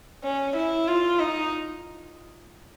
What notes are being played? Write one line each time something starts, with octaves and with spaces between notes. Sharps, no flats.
C#4
E4
F4
D#4